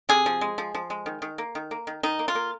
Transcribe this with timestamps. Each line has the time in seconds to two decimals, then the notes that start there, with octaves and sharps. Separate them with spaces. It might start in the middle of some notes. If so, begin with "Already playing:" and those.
0.09 C3 G#4
0.26 F3
0.41 G#3
0.58 F3
0.74 F3
0.90 G#3
1.06 D#3
1.22 D#3
1.38 A#3
1.55 D#3
1.71 A#3
1.87 D#3
2.03 D#3 D#4
2.19 A#3
2.28 F4
2.35 A#3